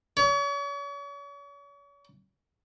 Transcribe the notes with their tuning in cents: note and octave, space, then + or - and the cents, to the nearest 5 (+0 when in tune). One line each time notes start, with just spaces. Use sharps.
C#5 +40